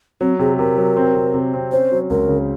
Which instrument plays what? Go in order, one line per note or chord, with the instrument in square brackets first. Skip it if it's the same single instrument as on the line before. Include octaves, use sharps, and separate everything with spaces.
[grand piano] F#3 [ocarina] C4
[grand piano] C3 [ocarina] G#4
[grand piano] C3 [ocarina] A#4
[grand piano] F#3
C4
C3
C3
C4
[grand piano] C#4 [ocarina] C5
[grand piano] F#3
[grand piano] C#2 [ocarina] A#4
[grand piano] C#3